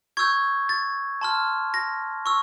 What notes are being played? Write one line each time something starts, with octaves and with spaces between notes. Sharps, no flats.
C#6 E6 G6 G#6
A6
A5 C6 F6
A#6
C#6 E6